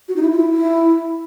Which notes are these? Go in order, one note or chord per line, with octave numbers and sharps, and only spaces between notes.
F#4
D#4
E4
F4
E4
E4